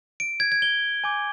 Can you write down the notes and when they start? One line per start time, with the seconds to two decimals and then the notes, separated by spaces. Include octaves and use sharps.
0.20 D7
0.40 G#6
0.52 G#6
0.62 G7
1.04 G#5 D6 G6